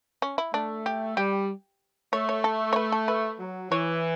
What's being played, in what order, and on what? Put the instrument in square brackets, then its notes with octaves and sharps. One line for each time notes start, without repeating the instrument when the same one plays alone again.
[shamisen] C#4
E4
[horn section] A3 [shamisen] D4
[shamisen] G4
[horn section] G3 [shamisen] G4
[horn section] A3 [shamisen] C#5
[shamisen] C#5
A4
C#5
B4
A4
B4
[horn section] F#3
[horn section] E3 [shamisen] C#5